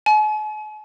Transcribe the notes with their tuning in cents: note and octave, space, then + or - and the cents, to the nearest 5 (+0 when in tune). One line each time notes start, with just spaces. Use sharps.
G#5 +45